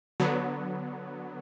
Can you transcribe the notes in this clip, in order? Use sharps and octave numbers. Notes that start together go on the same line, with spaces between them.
D3 F#3 B3